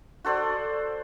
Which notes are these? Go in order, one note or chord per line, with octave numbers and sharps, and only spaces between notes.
F#4 A4 C5 D5